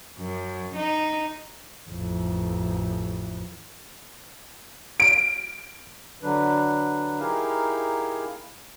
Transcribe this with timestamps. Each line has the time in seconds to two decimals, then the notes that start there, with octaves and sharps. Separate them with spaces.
0.19 F#2
0.75 D#4
1.90 A1 F2
5.00 D7
6.23 D3 F#3 D4 B4
7.20 D#4 E4 G4 G#4 A#4 F5